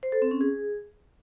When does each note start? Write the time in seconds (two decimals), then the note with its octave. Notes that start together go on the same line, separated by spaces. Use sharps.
0.03 C5
0.12 A4
0.22 C4
0.31 C#4
0.41 G#4